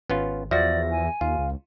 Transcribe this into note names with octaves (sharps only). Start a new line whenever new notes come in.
G#1 B3 C#4 F4
E2 F3 F#4 D5 E5 A#6
G#5
D#2 F4 F5
C#2